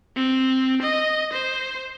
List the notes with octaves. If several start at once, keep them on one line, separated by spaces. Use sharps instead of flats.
C4
D#5
C5